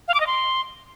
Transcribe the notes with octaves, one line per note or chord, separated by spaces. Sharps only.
F5
D6
D#5
C6